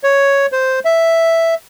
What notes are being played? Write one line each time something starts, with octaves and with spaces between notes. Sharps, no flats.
C#5
C5
E5